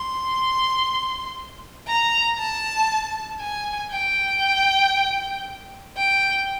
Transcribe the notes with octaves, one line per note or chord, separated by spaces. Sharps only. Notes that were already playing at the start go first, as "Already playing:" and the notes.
Already playing: C6
A#5
A5
G#5
G5
G5